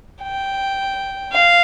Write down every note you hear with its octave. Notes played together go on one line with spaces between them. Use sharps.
G5
F5